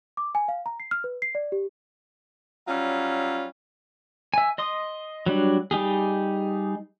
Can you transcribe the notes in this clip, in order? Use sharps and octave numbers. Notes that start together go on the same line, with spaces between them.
D6
G#5
F5
A#5
C7
F6
B4
C7
D5
G4
F#3 G3 C#4 F4
E5 G#5
D#5 C6 D#6
F#3 G3 D4
G3 D#4 G4 G#4